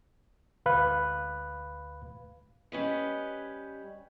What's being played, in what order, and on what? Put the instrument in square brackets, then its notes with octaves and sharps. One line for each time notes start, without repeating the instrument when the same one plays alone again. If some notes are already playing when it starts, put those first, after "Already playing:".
[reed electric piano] D2 B4 F5 B5 F#6
[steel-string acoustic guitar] G3 C#4 B4 D#5